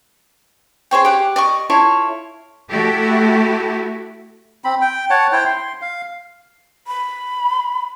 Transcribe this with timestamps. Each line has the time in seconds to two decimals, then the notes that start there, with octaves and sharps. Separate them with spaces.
0.91 G#4 C5 C#5 G5
1.05 G4 F#5
1.36 D5 D#5 C#6
1.70 E4 F4 A4 C#5
2.70 A3 E4 F#4 G4 A4
4.64 C4 B5
4.81 G5
5.10 C#5 F#5 A5
5.32 E4 C5 G5
5.45 C6
5.82 F5
6.87 B5